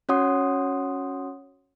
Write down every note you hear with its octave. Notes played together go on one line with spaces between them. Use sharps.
C#4 F#4 C#5 F#5 C6 D#6